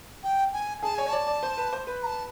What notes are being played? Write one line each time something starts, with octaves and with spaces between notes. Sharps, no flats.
G5
G#5
G#4 A5
C#5 G#5
C#5
D5 A5
D5
C5
B4
C5
B4
A#5
A5